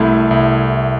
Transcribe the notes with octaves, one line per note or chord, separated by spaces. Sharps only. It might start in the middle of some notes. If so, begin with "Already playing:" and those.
Already playing: C2 A3 E4
C2